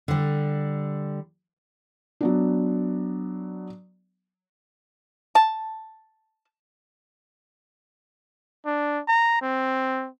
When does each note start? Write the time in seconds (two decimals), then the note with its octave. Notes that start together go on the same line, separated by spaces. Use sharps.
0.08 D3 G3
2.21 F#3 B3 D4
5.35 A5
8.66 D4
9.08 A#5
9.42 C4